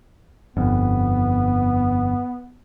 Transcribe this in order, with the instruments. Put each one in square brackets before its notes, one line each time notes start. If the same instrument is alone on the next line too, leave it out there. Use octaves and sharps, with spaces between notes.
[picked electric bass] G1 F2 [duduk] B3